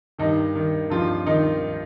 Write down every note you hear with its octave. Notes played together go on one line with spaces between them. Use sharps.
G2 D#3 D#4
D#3
G2 F3 F4
D#3 D#4